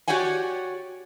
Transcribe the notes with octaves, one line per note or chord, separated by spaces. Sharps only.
F#4 G4 C#5 D5 F#5 G#5